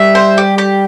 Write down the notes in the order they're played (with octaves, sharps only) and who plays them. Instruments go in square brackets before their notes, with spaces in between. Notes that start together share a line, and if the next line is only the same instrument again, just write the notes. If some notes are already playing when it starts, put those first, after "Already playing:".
Already playing: [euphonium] G3 [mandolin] E5
[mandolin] C5
G4
G4